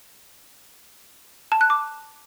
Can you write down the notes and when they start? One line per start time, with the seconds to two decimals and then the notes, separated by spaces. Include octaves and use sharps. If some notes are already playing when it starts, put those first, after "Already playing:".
1.52 A5
1.61 F#6
1.70 D6